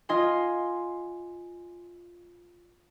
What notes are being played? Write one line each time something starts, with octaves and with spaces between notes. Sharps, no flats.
F4 D#5 G#5 C6